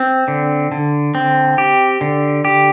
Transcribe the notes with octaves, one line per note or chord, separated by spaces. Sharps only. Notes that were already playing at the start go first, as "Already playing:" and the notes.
Already playing: C4
D3
D3
C4
G4
D3
G4